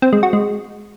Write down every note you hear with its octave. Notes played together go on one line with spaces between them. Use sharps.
C4
G#3
F#4
G#3